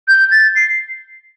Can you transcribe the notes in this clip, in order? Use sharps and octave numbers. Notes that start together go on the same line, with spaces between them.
G6
A6
C7